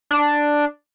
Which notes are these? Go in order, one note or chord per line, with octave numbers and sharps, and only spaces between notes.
D4